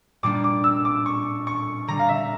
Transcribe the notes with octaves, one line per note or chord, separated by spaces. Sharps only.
A#2 G3 A#3 D4 D6
D6
E6
D6
C#6
C#6
D3 G3 D4 A#5
F5
E5